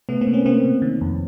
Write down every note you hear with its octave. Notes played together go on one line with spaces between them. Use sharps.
C3 A3 B3
A#3 C4
C3
B3 C#4
C3 A#3 C4
C3
D#3
F2